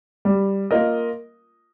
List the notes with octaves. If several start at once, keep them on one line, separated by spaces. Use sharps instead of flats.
G3
A#3 F4 A#4 D#5